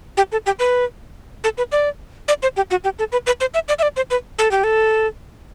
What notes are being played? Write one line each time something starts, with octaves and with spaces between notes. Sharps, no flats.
G4
A4
G4
B4
A4
B4
D5
D5
C5
G4
F#4
G4
A4
B4
B4
C5
E5
D5
E5
D5
C5
B4
A4
G4
A4